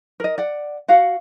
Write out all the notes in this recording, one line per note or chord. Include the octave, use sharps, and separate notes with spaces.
A#4 D#5
D5 F#5
F#4 F5 F#5